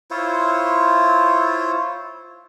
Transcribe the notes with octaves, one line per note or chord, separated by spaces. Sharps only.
E4 F4 C5 C#5